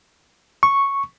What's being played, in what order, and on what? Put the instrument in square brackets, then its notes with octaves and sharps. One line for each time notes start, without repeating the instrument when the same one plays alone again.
[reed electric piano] C#6